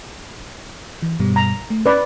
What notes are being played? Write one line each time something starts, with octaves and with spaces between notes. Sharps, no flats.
E3
G2 B2 G3
A#5
A3
C#4 B4 D5